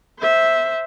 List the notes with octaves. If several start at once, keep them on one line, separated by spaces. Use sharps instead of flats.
C5 E5